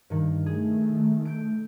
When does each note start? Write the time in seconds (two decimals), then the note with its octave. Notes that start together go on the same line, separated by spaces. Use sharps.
0.10 G2 D#3
0.46 D#3 A3 G#4
1.25 G6 D7